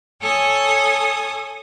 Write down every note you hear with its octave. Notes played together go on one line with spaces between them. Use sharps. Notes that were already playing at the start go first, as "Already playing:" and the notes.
A4 C#5 G#5 D#6